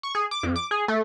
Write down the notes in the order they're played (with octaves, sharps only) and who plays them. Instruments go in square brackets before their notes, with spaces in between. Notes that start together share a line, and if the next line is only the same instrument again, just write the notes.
[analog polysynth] C#6
G#4
D6
F2
D6
G#4
A3